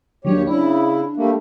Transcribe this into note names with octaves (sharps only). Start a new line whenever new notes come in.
D#2 D3 F#3 D4 G4 C#5
C#3 D4 E4
G3 A3 A#3